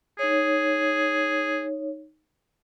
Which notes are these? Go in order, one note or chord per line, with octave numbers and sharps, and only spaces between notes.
D#4 G#4 C#5